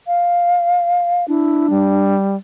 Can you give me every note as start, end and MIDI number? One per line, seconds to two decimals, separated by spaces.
0.07 1.27 77
1.28 2.13 62
1.28 1.67 64
1.70 2.36 55